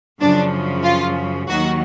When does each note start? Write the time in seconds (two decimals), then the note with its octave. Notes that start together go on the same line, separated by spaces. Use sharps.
0.20 F#2 C#3 F3 D4
0.83 F4
1.48 D#2 D#3 F#3 F#4